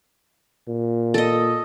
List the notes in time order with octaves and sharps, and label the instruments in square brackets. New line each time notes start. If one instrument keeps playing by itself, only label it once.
[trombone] A#2
[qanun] A4 D#5